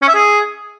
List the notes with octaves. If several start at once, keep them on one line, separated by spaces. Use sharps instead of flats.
C#4
E5
G#4